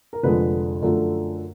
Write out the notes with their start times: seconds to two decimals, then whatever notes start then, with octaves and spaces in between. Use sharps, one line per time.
0.13 A#4
0.23 F1 F2 D3 F3 G#3 B4
0.82 F#2 D3 F3 A3